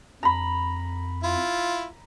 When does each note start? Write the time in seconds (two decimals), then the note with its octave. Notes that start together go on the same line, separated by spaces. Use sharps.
0.23 F2 A#5 B5
1.23 E4 F4